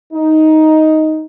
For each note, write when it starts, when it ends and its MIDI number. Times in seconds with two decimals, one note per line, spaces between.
0.14 1.24 63